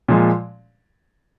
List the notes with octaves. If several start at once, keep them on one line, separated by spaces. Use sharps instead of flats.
A#2 F3 G#3